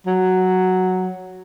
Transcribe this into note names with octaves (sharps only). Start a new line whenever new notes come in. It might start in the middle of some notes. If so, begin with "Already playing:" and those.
F#3